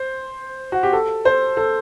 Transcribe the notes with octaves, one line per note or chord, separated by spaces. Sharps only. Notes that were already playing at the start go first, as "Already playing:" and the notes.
Already playing: C5
F#4
G4
A4
C5
A4